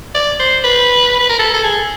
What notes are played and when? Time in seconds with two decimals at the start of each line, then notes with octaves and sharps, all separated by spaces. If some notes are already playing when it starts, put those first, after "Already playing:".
0.14 D5
0.39 C5
0.64 B4
1.20 B4
1.29 A#4
1.39 A4
1.54 A4
1.64 G#4